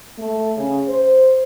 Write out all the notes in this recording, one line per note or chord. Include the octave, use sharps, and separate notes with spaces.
A3
C#3
C5